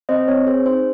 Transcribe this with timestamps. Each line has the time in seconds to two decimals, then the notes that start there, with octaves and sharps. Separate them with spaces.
0.09 C4 C5 D#5
0.28 C4 C#5
0.47 G#4 C5
0.66 D#4 C5